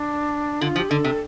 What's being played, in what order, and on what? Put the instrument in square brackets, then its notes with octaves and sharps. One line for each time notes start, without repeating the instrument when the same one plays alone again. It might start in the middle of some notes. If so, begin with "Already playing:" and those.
Already playing: [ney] D4
[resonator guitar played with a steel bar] D3 [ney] F4
[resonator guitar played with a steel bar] F3
[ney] G4
[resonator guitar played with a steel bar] D3 [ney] A4
[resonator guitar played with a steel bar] C3